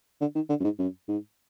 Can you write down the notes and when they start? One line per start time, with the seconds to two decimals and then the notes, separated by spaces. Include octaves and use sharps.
0.21 D3
0.35 D#3
0.49 D3
0.60 F#2
0.64 G#2
0.79 F#2
1.08 G#2